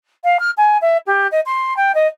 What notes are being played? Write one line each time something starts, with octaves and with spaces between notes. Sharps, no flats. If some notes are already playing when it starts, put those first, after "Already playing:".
F5
F6
G#5
E5
G4
D#5
C6
G5
D#5